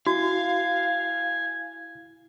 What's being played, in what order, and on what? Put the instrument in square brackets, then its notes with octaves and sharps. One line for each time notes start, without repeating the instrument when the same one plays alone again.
[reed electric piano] E4 [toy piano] F#4 [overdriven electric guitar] F5 [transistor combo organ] G#5